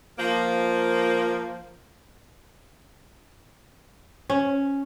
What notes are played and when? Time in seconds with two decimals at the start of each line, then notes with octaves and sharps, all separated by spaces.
0.19 F3 A#3
4.30 C#4